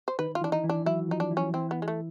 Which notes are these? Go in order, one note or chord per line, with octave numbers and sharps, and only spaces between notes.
C5
D#3 D#4 B4
F4
E3 E4
D4
D#4
E3 E4
D4
F#3 E4 F#4
F3 D#4 F4
D4
E3 E4
C#4
E3 C4 E4
B3
G#3
A3